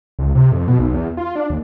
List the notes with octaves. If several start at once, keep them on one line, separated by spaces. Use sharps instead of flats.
C#2
C3
F2
B2
B1
E2
F4
D4
D#2